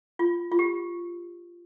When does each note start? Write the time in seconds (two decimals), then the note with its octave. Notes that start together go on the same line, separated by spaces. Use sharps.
0.19 F4
0.52 F4
0.59 G4